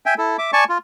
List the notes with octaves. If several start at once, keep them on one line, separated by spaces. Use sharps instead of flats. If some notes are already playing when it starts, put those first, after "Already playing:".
E5 G5 G#5
E4 A4
E5 D6
D5 G#5 A5 C#6
F4